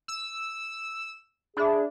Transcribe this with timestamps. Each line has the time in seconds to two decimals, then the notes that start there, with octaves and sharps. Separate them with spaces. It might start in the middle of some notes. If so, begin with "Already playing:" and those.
0.08 E6
1.57 D4 G#4 E5 B5